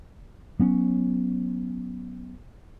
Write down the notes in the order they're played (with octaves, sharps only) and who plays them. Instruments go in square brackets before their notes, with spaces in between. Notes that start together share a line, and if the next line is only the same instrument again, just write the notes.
[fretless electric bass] F#3 B3 C#4